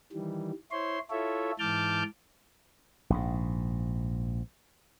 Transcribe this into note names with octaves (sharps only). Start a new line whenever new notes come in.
D#3 E3 G3
E4 C5 C#5 C6
E4 F4 A4 C#5 E5
G#2 E3 A5 D6 F6 G6
A#1 G#2